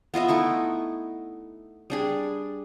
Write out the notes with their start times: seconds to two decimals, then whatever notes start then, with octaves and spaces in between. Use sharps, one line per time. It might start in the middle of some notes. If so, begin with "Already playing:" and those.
0.14 B3 F4 D#5 E5
0.28 A3 D#4 E4 C#6
1.90 G3 D4 G#4